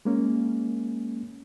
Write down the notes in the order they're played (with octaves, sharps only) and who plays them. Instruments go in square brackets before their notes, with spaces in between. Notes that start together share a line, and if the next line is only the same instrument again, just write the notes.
[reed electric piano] G#3 A#3 C#4